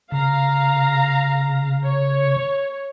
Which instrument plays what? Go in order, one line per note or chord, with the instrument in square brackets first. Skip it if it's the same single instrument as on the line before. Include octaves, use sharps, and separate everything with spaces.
[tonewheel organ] C#3 [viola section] F5 A#5
[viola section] C#5